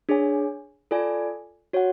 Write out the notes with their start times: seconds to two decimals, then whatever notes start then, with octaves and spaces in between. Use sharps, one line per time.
0.09 D4 G#4 C#5 G#5
0.91 F4 A4 D5 G#5
1.73 F#4 C#5 F#5